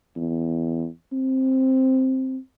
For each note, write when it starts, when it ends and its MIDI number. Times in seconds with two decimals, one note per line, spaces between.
0.16 0.87 40
1.12 2.37 60